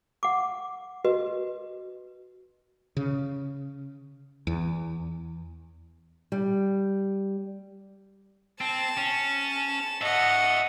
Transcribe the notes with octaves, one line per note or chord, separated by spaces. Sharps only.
F#5 D6
F#4 B4 D#5
C#3
E2
G3
C4 A5
C#4
C#5 D#5 E5 F#5